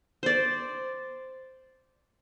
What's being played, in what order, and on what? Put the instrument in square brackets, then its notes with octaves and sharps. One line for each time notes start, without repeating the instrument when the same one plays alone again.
[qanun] C5 D5